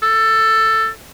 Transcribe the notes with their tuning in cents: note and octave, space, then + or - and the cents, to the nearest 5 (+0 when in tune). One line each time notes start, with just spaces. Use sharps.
A4 +10